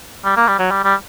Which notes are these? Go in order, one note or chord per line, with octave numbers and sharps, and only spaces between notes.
G3
A#3
G3
F#3
G3
G3